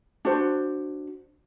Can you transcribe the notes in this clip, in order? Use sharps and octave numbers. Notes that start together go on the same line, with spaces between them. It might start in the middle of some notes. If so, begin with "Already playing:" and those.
D4 F#4 C5